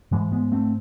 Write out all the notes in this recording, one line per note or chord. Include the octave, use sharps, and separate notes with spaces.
G#2 E3 G#3
G#3 B3
A3 C4